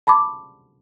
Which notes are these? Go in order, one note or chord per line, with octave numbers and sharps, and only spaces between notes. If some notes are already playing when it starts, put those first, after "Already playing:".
A5 B5 C6 D6